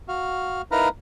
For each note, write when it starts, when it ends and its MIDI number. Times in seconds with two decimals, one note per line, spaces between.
0.08 0.62 66
0.08 0.62 77
0.72 0.89 63
0.72 0.89 64
0.72 0.89 70
0.72 0.89 71
0.72 0.89 77
0.72 0.89 82